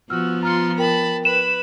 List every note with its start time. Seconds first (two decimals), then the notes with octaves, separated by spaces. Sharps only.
0.10 F3 B3 F#4 E6 F6
0.43 F4 A#5 C6 F6 C#7
0.78 A#4 G5 A5 B5
1.25 B4 B5 E7